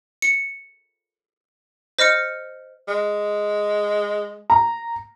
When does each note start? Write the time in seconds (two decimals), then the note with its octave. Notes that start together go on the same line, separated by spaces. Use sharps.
0.22 C#7
1.99 C5 D#5 F6 C#7
2.88 G#3
4.50 A#5